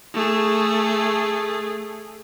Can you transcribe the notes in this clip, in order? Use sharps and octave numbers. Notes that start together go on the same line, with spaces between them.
A3 G#4